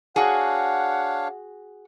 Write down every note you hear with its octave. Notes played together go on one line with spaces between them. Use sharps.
D4 F#4 G#4 C#5 F5 F#5